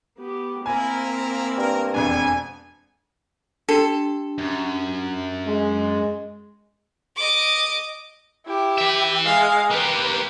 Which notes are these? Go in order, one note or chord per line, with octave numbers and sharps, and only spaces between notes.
B3 G4
A#3 C4 E4 A#4 F5 G#5
G2 A#4
E1 F2 D4 G#5
D4 G4 A4
F#2
G#3
D#5 D6
E4 G4
B4 E5
G#3 F5
A#3 G4 B4